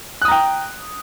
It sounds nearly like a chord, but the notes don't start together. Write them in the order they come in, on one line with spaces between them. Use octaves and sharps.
F#6 D#6 A#5 G5